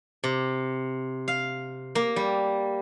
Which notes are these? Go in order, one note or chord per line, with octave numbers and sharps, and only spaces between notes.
C3
F5
A#3
G3